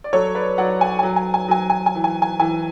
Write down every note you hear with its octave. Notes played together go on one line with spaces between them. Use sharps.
D5
F#3 A4 C#5
B4 D5
F#3 D5 F#5
G#5
G#5
F#3
G#5
G#5
F#3 G#5
G#5
G#5
E3
G#5
G#5
E3 G#5